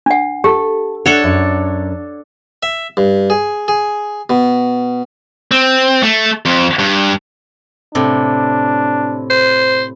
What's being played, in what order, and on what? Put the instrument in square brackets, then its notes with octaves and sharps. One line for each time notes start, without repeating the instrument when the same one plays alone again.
[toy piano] D4 F#5
[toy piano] G4 [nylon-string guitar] A4
[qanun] D4 A4 C#5 [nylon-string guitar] F#5
[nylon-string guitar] F#2
[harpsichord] E5
G2
G#4
G#4
B2
[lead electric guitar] C4
A3
F2
G2
[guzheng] A2 C3 [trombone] D4
[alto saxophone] C5